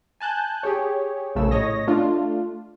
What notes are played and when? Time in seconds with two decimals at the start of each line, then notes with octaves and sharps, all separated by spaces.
0.20 G#5 A5 F#6 G6
0.63 G4 G#4 C#5
1.35 A#1 C#3 A3 E6
1.51 A2 C#5 D#5 A#6
1.87 A3 D4 F4